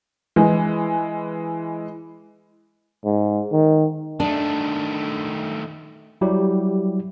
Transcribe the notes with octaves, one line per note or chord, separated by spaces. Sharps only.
E3 G#3
G#2
D#3
D#3 A3 D4
F#3 G3 E4 G4